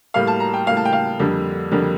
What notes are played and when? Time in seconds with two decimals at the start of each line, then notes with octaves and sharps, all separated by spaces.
0.14 A2 G3 A#3 F5
0.27 A5
0.40 A#5
0.54 G5
0.67 A2 G3 A#3 F5
0.77 A5
0.85 G5
0.93 F5
1.19 F2 D3 G3 A#3
1.72 F2 D3 G3 A#3